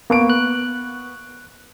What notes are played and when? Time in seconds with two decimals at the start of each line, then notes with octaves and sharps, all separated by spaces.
0.10 A#3 B3 C#6 D7
0.30 F#6